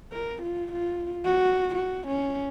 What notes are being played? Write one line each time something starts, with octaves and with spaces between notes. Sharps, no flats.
A#4
F4
F4
F#4
F#4
C#4